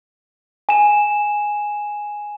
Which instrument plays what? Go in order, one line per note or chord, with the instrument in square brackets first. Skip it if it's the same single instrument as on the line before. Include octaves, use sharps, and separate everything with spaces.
[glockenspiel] G#5 E7